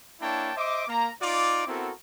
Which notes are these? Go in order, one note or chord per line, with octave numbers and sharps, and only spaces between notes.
A#3 D4 E4 C#5 G5 A5
C5 D#5 E5 D6
A#3 A#5
D#4 F4 D5 D6
B3 C4 E4 F#4 A4 A#4